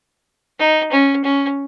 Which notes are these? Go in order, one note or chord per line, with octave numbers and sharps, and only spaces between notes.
D#4
C#4
C#4